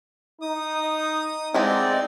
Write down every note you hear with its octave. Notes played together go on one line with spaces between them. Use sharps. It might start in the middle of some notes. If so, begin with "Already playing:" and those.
D#4 D#6
G#3 B3 C4 D#4 E4 D5